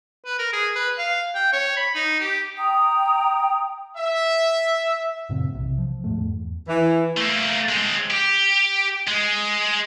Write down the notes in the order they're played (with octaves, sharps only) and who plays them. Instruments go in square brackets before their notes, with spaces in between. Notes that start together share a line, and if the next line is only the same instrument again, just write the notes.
[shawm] B4
A#4
G#4
B4
F5
G5
C#5
B5
D#4
G4
[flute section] G5 A#5 D#6
[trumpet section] E5
[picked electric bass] F#2 A#2 C#3 C4
B1 C3
F3
D#2 G#2 A3
E2
[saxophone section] E3
[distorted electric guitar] A3 A#3
G#3 C4
G4
G#3